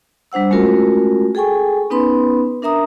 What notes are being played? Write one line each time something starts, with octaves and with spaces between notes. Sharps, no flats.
G3 D4 C5 F#5 E6
G#3 A3 C#4 F4 F#4 A#4
G#4 A4 G5 G#5 C#6
B3 C#4 D#4 B4 B5 C6
D4 A#4 E5 A#5 D#6